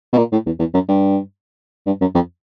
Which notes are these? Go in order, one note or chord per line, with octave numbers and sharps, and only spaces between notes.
B2
A#2
A2
E2
E2
F#2
G2
G2
F#2
F2